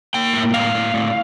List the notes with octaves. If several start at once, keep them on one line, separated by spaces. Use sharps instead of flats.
A#3 G5
A2
A2 F5
A2
A2